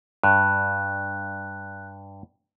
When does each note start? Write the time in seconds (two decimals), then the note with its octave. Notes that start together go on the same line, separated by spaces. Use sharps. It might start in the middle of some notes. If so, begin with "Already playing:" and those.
0.24 G2 F#6